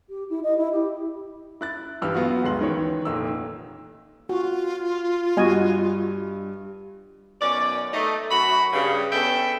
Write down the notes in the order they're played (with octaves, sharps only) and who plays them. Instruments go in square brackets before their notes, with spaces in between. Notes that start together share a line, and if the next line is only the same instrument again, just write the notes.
[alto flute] G4
E4
D#5
E4
G4
[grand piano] E4 F#6 A6
A#1 G2 E3 G4 E6 F6
F#3 B3 F4 F#4
D1 G1 G#3 C6 F#7
D#3 E3 C#5
F1 A#2 D#4 E6
[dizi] F4 [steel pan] F#4
[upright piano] G2 [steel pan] F#4 D#5 G#5
[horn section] F#2 B2 D#3 C#4 D5
A3 D#4
F#2 F#4 B5
G2 C#3
B3 C#4 A4 E5 G5